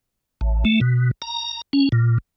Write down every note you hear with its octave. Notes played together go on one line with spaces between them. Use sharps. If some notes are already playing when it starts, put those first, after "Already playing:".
A1
A3
B2
A#5
C#4
A#2